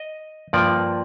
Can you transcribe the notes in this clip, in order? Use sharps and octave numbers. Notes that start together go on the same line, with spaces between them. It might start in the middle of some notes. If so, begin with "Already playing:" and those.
Already playing: D#5
G2 F3 A#3 D5